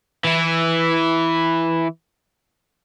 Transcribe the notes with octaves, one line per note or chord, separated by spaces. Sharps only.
E3 E4